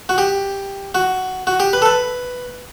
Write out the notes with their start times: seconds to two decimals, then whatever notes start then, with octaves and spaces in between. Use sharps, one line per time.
0.09 F#4
0.18 G4
0.95 F#4
1.47 F#4
1.60 G4
1.73 B4
1.82 A4
1.85 B4